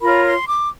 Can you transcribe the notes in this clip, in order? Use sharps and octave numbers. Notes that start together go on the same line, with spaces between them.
F4 A#4 C#5 B5
C6
D6